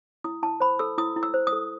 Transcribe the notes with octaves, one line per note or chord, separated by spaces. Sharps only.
E4 D#6
E4 A5
C5 B5
A4 E6
E4 D#6
E4
E6
C5
D#6
A4